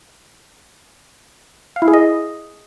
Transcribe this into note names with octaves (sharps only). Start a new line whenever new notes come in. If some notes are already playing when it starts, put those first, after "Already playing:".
F5
E4
G#4
D#5